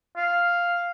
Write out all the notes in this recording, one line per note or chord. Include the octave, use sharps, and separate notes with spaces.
F5